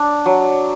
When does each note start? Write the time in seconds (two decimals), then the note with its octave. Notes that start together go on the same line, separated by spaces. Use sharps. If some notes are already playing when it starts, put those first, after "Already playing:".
Already playing: D4 D5
0.26 F#3